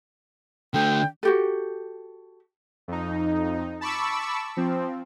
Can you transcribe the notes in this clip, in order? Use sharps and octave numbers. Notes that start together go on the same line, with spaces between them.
D3 A3 G5
F#4 G4 A4
F2 D#4
A5 B5 C#6 D6 E6
F3 C4